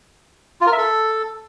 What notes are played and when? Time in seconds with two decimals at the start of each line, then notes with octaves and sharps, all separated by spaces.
0.61 F4
0.67 A#4
0.72 E5
0.78 A4